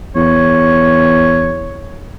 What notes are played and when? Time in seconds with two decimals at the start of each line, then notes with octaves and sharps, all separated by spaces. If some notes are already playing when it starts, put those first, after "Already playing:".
0.16 E2 C#5